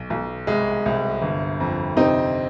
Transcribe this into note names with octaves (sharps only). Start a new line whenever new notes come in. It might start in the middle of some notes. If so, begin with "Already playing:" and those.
Already playing: B1
B1
C2 G#3
C2
G1
F2
C3 C4 D#4